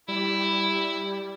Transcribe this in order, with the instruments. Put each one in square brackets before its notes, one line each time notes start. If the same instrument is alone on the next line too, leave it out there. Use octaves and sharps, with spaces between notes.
[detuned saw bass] G3 [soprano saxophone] E4